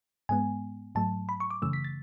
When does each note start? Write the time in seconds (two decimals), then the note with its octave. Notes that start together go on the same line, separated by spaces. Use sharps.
0.29 G#2 G#3 B3 G#5
0.95 G#2 F#3 A3 A5
1.29 B5
1.40 C#6
1.50 D6
1.62 F#2 C#3 E3 A3 E6
1.73 B6
1.84 A6